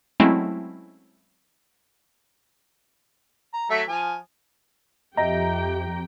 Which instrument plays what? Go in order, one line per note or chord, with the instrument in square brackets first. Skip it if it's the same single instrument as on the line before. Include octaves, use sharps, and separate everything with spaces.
[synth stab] F#3 G#3 A3 C4 C#4 E4
[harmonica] A#5
F#3 A3 E5
F3 G#5
[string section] F2 [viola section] G4 G5 [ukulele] D#5 E5 [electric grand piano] A#5 A#6